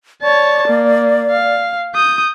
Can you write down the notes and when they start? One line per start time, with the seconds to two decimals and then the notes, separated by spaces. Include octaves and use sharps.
0.22 C#5 D5 A5
0.68 A#3
1.31 F5
1.95 D#6 G6